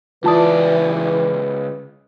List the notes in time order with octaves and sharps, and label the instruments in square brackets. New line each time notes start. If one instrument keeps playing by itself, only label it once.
[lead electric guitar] C#2 D5 [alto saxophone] E3 [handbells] F4 A5 D#6 [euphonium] B4